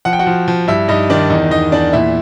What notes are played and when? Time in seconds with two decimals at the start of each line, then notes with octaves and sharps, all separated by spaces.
0.05 F3 F#5
0.13 G5
0.19 F#4 F#5
0.27 F3
0.48 F3
0.68 G2 E4 E5
0.88 G2 D#4 D#5
1.10 D#3 D4 D5
1.30 E2 D#4 D#5
1.51 E2 D#4 D#5
1.72 E2 D4 D5
1.93 A#2 E4 E5